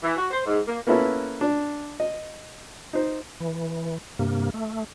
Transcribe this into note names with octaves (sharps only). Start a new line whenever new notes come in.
E3
F#4
C5
G#2
A#3
A#3 B3 C#4 E4 A4 B4
D4
D#5
D#4 C5
E3
G2 C3 A#3
A3